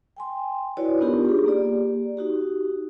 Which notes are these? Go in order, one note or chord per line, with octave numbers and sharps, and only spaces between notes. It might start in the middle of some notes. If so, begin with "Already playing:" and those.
G5 G#5 C6
E4 F#4 B4 C#5 D5
B3 D4 D#4 F4 G4 A#4
G4 G#4
A#3 G4 D5
D#4 F#4 G4